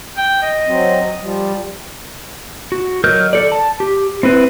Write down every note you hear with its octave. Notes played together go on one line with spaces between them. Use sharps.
G5
D#5
F#3 C4
F3 G3
F#4
F#3 A#4 D#5 F6 G6
A4 D5
A5
G4
C4 E4 B4